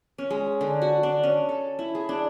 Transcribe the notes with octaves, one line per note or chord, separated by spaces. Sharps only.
C#4
G#3
D3
F#4
D4
C#4
A4
E4
G#4
D4